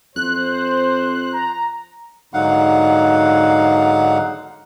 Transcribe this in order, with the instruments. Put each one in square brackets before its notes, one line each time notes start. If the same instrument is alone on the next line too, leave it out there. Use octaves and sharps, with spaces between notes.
[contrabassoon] F2 [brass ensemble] C5 [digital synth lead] F#6
[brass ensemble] A#5
[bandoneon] G#2 D3 F#3 D#4 F5 F#5